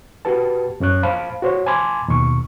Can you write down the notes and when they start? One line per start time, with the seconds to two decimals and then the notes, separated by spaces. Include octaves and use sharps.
0.25 F#4 G4 B4 A5
0.80 F#2 C#4 C#5 F#6
1.03 C5 F5 A5 B5
1.42 F#4 C5 C#5
1.66 G#5 A5 B5 C6 D6 G#6
2.08 D#2 B2 C#6